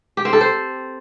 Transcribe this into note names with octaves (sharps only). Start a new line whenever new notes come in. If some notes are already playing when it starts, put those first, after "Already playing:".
G4
C4
A4
C5